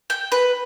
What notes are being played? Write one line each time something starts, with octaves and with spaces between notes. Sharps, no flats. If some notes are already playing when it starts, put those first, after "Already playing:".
G5
B4